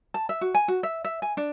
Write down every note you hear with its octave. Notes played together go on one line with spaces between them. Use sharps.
A5
E5
F#4
G#5
F#4
E5
E5
G#5
D4